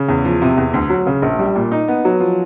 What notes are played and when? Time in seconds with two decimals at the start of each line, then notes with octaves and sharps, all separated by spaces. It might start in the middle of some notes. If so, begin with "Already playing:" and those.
Already playing: C#3
0.09 E2
0.25 F3
0.42 C3
0.57 E2
0.74 D2
0.90 F#3
1.07 C#3
1.22 A#1
1.39 G3
1.56 A#2
1.71 D#4
1.88 B3
2.05 F#3
2.20 F3